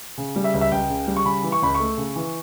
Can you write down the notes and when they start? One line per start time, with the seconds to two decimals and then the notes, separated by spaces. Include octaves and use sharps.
0.18 C#3
0.36 G3
0.44 E5
0.54 C#2
0.61 E5
0.72 C#2 G5
0.89 C#3
1.07 G3
1.16 C#6
1.25 C#3 B5
1.43 E3
1.52 C#6
1.62 C#2 B5
1.75 C#6
1.80 A3
1.97 C#3
2.16 E3